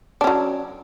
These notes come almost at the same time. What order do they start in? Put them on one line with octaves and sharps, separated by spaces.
D4 C#4 F#3